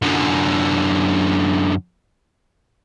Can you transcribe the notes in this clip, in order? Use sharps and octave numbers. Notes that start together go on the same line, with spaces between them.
F#2 D3